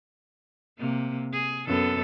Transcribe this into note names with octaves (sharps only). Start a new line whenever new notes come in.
C3 A#3
G#4
F#2 B3 A4